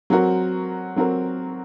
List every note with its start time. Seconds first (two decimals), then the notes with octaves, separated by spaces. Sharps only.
0.10 F#3 C4 F#4 A#4
0.96 F#3 C4 F#4 A#4